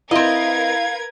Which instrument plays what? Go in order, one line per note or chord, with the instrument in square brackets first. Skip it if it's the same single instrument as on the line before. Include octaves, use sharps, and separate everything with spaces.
[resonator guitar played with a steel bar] C4 D#5 [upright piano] E4 [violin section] A#4 B4 G#6 [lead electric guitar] F5